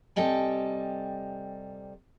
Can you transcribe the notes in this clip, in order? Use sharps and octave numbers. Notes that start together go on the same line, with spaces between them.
C3 G3 A4 D#5 G5 G#5